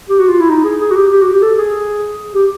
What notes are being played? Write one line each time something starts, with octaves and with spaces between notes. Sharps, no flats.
G4
F#4
F4
E4
D#4
G#4
G#4
F#4
G4
G4
F#4
G4
A4
G#4
G4